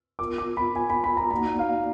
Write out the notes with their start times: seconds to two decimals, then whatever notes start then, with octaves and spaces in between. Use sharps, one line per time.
0.19 B3 F4 A#4 D6
0.38 D6
0.57 B5
0.76 G#5
0.90 B5
1.04 B5
1.17 A#5
1.31 A#3 D#4 F#4 D5 F#5 A#5
1.59 F5